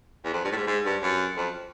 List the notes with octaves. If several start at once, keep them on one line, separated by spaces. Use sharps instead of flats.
E2
F2
G2
A2
G#2
G#2
G2
F#2
F2